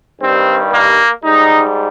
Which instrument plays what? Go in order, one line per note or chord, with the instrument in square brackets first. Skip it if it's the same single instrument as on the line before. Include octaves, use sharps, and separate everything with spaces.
[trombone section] G2 D#3 G3 C4
A#3
G#2 G3 D#4